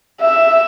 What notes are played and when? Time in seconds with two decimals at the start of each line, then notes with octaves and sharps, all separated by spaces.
0.21 E5